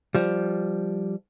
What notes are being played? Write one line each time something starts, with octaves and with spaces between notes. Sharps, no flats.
F3 G3